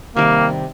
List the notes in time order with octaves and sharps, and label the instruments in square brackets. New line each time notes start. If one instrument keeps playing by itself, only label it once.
[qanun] C3 D#3 G3 [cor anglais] A#3